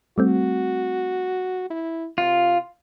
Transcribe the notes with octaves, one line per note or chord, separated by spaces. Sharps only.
G3 A3 C4 F#4
E4
C3 F4